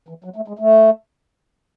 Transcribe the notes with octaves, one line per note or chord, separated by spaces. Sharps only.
E3
F#3
A3
G#3
A3